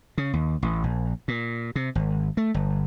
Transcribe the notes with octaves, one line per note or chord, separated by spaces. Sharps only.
C#3
D#2
A1
A#1
A#2
C3
G#1
A3
G1